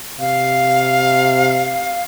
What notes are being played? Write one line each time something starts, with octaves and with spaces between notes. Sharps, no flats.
C3 F5